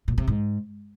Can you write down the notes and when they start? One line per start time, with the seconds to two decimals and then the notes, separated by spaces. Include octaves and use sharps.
0.08 A#2
0.18 C3
0.27 G#2